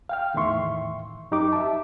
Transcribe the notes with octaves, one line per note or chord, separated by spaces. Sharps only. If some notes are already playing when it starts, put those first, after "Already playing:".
F5 G5 F6
E2 A2 D#3 E5 C6 C#6
F#2 D#4 G4 D6
E5 A5